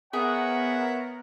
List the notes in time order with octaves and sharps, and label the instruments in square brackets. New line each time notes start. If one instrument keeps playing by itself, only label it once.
[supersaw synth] B3 A#4 [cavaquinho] G#4 [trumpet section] C#5 F#5 [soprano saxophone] E5